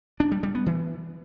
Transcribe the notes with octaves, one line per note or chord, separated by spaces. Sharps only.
D4
G3
G3
B3
E3